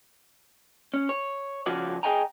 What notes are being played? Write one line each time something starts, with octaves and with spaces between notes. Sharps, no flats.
C#4
C#5
C#3 F3 C#4 F#4 D5
G#4 B4 D#5 G5 G#5 A#5